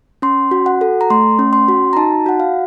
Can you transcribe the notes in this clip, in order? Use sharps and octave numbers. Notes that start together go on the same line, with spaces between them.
C#4 C6
F#4
F#5
A4
A#5
A3 C6
C#4
C6
F#4
A#5
D#4 A5
F#4 F#5
F5